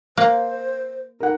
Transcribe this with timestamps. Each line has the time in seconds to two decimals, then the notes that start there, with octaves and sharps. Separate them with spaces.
0.17 A#3 C5
1.20 D#4 A#4 F#5